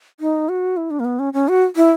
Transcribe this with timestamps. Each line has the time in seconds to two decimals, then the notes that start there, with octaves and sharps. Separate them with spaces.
0.20 D#4
0.49 F#4
0.77 E4
0.91 D4
1.00 A#3
1.05 B3
1.19 C#4
1.33 C#4
1.48 F#4
1.76 E4